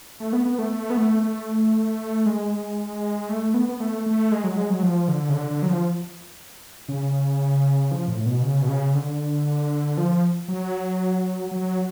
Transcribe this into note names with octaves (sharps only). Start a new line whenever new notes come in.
A3
B3
B3
A3
A3
B3
A3
A3
G#3
A3
B3
B3
A3
A3
G#3
F#3
G#3
F#3
F3
D3
C#3
D3
D3
F#3
F3
C#3
F3
A2
B2
C#3
B2
C#3
D3
F3
F#3
F#3